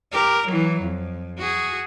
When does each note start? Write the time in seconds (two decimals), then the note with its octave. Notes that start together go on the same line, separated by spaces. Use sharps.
0.12 G4 A#4
0.47 E3 F#3
0.81 F2
1.38 F#4 G#4